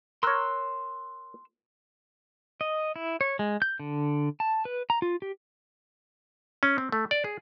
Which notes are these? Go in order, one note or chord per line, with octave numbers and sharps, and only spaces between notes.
A#4 C#5 C6 E6 F#6
D#5
E4
C#5
G#3
G6
D3
A5
B4
A#5
F4
G4
C#4
C4
A3
D5
G#4